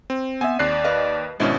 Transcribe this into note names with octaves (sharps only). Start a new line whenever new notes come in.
C4
B3 C4 E5 G#5
D#2 C4 D5 F#6 C7
B4 D#5 F5
G#1 B2 G#3 C#4 D4 E4 C5